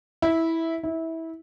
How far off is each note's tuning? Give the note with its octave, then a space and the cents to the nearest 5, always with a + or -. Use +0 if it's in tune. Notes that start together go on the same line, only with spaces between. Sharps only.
E4 -10
E4 -20